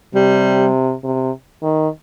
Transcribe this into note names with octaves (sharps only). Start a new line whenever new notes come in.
C3 G3
C3
D#3